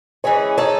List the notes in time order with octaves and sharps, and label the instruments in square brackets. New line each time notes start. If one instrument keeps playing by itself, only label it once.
[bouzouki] E3 G#3 C#4 G#4 [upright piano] C#5
[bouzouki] G#3 D#4 A4 [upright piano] C#5